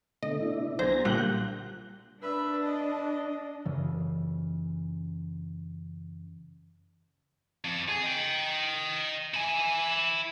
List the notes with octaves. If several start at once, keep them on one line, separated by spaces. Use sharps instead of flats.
B2 D3 A3 D#5
B2 D4 E4
B1 C5 G#5 A#5 A#6
A#2 D3 G3 F#5 F#6 G6
D4 B4 E5
D#5
F#2 C#3 E3
F2
G#4
D#5 G5
E4 G#5